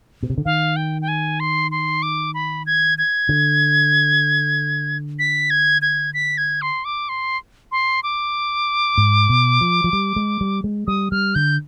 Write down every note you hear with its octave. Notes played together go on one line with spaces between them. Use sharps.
B2
C3
D3
D#3 F5
G5
G5
G#5
C6
C6
D6
B5
G#6
G#6
D3
B6
G#6
G#6
B6
G#6
C6
D6
C6
C6
D6
G#2
B2
F3
F3
G3
G#3
G3
G#3
G3 D#6
G3 F6
D3 G6